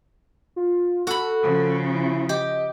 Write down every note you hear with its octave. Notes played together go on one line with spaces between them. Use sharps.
F4
F#4 A4 B5
C#3 F3
E4
G4 D#5